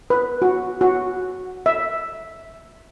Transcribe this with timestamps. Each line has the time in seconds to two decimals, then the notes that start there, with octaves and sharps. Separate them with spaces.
0.10 B4
0.42 F#4
0.81 F#4
1.66 E5